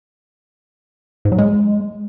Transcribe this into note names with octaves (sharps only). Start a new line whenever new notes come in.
G#2
F#3
G#3